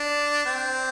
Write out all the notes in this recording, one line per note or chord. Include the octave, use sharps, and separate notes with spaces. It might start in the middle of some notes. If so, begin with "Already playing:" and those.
Already playing: D4
C4